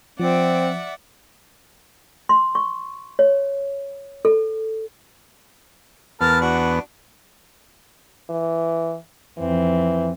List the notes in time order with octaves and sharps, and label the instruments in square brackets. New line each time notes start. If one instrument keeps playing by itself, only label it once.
[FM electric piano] F3 [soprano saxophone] C4 [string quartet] D5 E5 F#5
[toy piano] C6
C#6
C#5
A4
[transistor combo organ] E2 B3 [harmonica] A#4 A5 F6
[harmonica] D4 F#4
[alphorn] E3
[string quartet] F2 C4 [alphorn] E3